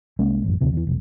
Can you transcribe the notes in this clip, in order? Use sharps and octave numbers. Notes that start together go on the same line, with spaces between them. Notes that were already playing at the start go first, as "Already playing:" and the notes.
C2 G#3 A#3 C#4
A1 F#2
D2 C3 E3
E2 E3
F1 B1